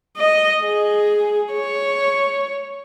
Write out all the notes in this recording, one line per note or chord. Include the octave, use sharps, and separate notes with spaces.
D#5
G#4
C#5